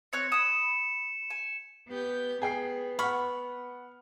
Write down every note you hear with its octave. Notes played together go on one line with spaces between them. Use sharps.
C4 C#5 F#6 C#7
B5 D#6 E7
G#5
B3 G4 G6
B3 G#4 G5 C7
F#5 B5 C#6 F6